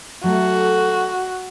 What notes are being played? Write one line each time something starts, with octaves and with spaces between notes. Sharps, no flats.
F#3 A3 F#4 A4